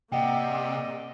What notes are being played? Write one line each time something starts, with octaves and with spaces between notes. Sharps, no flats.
C3 A#3 D5 D#5 F#5 G5